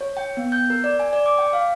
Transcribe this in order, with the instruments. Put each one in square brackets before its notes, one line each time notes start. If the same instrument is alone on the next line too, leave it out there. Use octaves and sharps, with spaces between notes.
[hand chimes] C#5
G5
B3
G6
A#4
D5
G#5
D5
D6
G5
F5